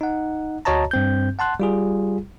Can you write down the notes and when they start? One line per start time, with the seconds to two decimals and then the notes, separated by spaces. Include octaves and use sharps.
0.01 D#4 F#5
0.65 D2 F#4 C#5 D#5 A5 A#5
0.91 G2 C4 G6
1.39 F#5 A5 C6 F#6
1.60 G3 F4 G#4